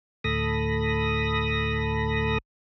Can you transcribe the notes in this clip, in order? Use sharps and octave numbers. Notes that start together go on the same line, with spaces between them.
D2 A2 A4 B5 D#6 A#6